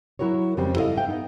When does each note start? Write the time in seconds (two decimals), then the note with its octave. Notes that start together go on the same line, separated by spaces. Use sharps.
0.19 F#3 E4 F#4 A#4 C#5
0.57 F2 C#3 G3 G#3 C4
0.76 E4 A4 C5 D#5 F5
0.96 E5 F5 G5
1.09 B3 D#4